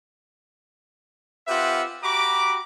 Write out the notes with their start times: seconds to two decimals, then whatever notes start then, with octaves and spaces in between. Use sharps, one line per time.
1.48 C4 F4 G4 B4 E5 F#5
2.03 F#4 G4 A#5 B5 D6